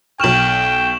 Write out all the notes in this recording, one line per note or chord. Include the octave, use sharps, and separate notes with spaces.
B1 G5 C#6 F6 E7 F#7